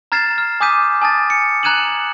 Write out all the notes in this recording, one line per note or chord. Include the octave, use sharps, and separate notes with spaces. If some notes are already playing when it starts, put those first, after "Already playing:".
A#5 F6 G#6 A6 C7 E7
F6
G#5 D6 D#6 G6 B6 D#7
G#5 A5 D#6 A6
C#7
A#5 F#6 G#6 D#7 E7 F#7